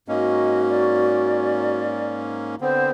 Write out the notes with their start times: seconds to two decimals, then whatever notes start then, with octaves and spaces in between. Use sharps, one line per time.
0.08 G#2 A#3 C#4 F#4 D#5
0.69 D5
2.61 D3 B3 C4 C5